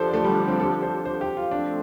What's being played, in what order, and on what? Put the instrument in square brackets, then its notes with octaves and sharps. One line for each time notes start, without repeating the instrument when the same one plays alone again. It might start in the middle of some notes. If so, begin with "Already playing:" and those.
Already playing: [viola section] D3 F3 D4 G4 [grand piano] A4 C5 D5
[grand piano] A3
G3
C4
A4
C5
C5
G4
F4
[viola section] F3 A3 C4 A4 [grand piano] D4